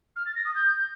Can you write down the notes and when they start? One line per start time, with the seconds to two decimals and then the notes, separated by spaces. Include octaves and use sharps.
0.16 F6
0.25 A6
0.35 A#6
0.45 D#6
0.54 G6